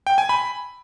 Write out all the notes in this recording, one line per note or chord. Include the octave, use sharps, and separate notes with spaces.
G5
G#5
B5